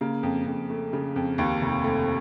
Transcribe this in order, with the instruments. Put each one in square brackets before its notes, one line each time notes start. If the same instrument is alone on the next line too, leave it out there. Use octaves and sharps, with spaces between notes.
[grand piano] C#3 A#3
F2
F2
A3
C#3
F2
D#2 A#3
F1
A3